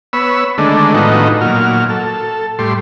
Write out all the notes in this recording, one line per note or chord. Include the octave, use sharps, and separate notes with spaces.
B3 C#5 B5 E6
D3 D#3 G#3 A3 D4
A2 D#3 F3 B3 D#4 F#4
A#2 F#3 F6
A4
A2 G3 C6